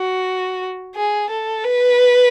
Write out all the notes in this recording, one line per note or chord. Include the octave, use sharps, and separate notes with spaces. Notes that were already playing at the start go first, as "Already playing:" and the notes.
Already playing: F#4
G#4
A4
B4